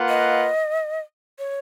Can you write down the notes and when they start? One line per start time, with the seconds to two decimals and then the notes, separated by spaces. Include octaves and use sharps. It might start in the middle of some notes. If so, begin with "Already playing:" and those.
Already playing: A#3 F4 B4 F#5
0.09 D#5
1.39 C#5